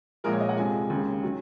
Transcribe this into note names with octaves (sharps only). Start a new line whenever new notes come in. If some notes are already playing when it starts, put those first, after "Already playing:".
A#1 A#2 F3 G#3 A#4
C#5
D#5
F#5
F2 C3 F3 G#3 G#5
D#2 C#3 G#3
D#3 F#3